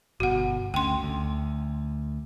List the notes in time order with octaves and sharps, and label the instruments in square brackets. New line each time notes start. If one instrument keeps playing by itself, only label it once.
[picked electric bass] G1 B2 [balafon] F#4 F#5
[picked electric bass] D2 C#4 [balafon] G5 C6
[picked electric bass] D2